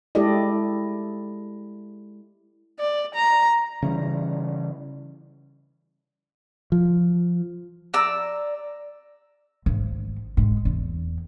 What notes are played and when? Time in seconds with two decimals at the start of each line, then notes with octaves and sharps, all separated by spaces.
0.15 G#3 E4 G4 A4 D5 D#5
2.80 D5
3.15 A#5
3.82 C#3 E3 G3
6.72 F3
7.94 D5 A#5 E6
9.66 G#1
10.37 G#2
10.65 E2